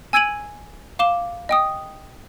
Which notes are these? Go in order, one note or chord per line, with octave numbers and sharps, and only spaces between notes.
G#5 E6 G#6 D7 D#7 F#7
F5 D6 E7 G7
D#5 G5 D#6